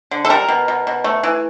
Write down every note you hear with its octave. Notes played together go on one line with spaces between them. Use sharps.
D3
A4
G3 A#4
B2
B2
B2
A3
E3